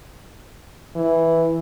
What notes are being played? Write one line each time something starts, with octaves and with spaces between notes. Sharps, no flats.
E3